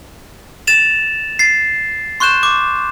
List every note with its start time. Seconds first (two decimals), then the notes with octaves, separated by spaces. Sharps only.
0.67 A6 E7 F7
1.39 A6 C7
2.20 C6 C#6 F#6 G6 E7
2.43 D6